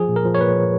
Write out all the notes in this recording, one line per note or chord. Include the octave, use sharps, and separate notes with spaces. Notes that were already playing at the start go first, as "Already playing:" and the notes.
Already playing: F3 G#4
A#2
A#4
F3
C#5
A#2 B4
F3